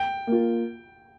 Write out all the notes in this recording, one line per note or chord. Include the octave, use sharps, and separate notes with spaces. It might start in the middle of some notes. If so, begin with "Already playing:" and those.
Already playing: G5
A#3 F4